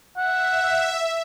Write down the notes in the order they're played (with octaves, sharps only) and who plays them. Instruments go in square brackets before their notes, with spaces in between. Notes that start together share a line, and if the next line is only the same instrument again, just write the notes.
[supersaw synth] E5 [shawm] F#5